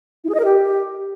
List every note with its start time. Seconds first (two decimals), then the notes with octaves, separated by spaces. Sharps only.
0.24 E4
0.29 G#4
0.34 D#5
0.40 A#4
0.45 G4